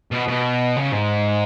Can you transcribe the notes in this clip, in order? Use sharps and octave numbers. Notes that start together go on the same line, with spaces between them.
B2
B2
C#3
G#2